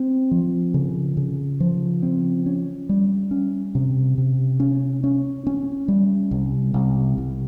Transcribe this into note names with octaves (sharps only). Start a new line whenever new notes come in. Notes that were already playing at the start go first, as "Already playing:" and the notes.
Already playing: C4
F3
C#3
C#3
F3
C4
C#4
G3
C#4
C3
C3
C#4
C#4
C#4
G3
C2
C2
C2